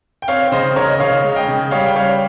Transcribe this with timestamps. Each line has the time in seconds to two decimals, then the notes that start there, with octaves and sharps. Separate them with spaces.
0.22 G5
0.28 C4 C#5 F5
0.52 C#3 C5 D#5
0.76 C#3 A#4 C#5
0.88 D#5
1.00 C#3 C#5 F5
1.24 G#3
1.35 D#5 G5
1.48 C#3
1.71 G3 C#5 F5
1.86 G5
1.96 G3 C#5 F5